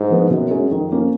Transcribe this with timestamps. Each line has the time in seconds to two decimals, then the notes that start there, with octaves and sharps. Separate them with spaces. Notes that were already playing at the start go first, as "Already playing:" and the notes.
Already playing: G#2
0.10 F3 B3 D#4
0.30 F#2 B2
0.51 G#3 C#4 G#4
0.70 F2 D#3
0.92 A#3 C#4 F4